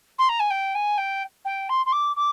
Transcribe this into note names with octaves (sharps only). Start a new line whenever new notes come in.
C6
A#5
G#5
G5
G#5
G5
G5
C6
C6
D6
D6